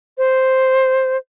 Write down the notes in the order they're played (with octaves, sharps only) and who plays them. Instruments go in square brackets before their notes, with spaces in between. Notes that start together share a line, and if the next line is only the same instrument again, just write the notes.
[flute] C5